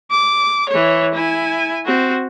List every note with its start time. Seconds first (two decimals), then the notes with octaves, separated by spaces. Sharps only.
0.11 D6
0.69 E3 C#5
1.14 E4 G#5
1.85 C4 F#4